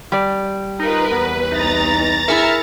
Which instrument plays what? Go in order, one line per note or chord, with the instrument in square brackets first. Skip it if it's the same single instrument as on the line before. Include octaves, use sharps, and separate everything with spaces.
[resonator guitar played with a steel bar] G3 D5
[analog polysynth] D#4 [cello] F4 A#4 [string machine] B4
[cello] E2 [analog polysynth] B3
[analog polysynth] C2 D#4 [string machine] A#5 A6
[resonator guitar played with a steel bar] E4 G#4 A#4 [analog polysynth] E5 F6 C#7